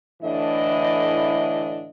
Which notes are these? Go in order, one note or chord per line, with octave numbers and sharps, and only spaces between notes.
A2 D3 E3 D4 E4 D#5